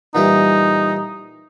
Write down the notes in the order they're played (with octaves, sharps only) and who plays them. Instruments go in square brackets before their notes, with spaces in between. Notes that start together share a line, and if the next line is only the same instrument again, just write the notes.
[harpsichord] A#2 E3 G3 [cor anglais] D#4